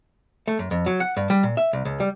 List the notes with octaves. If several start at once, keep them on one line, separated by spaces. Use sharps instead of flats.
A3
F#2
F2
F#3
F#5
G2
G3
A#2
E5
C2
C#2
G3